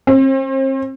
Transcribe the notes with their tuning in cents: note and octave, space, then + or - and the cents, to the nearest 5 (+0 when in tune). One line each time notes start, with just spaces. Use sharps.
C4 +40